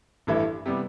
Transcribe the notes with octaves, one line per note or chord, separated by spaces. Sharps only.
A1 G2 E3 A3 E4
C3 G3 B3